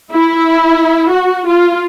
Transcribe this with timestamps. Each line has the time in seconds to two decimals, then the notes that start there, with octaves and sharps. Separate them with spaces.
0.13 E4
1.11 F#4
1.48 F4